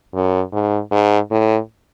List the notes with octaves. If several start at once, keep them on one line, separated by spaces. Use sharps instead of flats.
F#2
G#2
G#2
A2